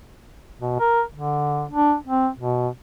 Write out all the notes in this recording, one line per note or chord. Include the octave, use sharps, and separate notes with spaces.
B2
A#4
D3
D4
C4
B2